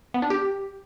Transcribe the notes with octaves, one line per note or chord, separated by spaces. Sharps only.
B3
D4
G4